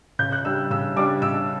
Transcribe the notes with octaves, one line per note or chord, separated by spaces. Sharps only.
C#3 G6
F#6
G3 D4 E6
C#3 E6
G3 D4 D6
C#3 E6